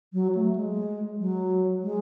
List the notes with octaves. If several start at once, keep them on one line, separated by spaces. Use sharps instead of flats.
F#3
A3
G#3
F#3
G#3